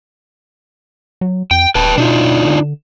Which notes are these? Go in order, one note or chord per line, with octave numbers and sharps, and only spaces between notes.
F#3
F2 G5
D1 B4 G5 A5
B2 D4 D#4 F4
D3